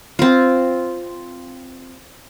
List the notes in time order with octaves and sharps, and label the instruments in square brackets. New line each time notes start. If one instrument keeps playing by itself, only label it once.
[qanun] C4 F4